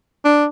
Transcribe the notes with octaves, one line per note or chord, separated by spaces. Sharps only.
D4